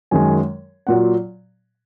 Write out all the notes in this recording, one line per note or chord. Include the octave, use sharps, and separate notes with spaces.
F#2 D#3 G#3 G#5
A#2 F#3 F#5